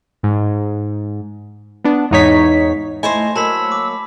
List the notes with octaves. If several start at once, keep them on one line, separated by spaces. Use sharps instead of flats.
G#2
B3 D4
E2 G#2 D#4 C#5 B6
A3 E4 C5 C#5 D#5 G#5
F#3 A#3 A5 B5 E6 B6
D6